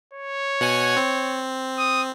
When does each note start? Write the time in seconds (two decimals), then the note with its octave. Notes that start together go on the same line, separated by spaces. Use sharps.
0.14 C#5
0.61 B2 F#5 G#5
0.97 C4
1.79 D#6